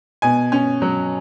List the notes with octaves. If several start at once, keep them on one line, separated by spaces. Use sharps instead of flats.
B2 G#5
C#4
F#3